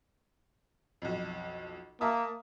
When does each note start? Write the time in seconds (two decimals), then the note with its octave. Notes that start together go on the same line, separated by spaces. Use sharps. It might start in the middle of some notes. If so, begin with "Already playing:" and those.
1.02 B1 F2
2.01 A#3 E5 A5 D#6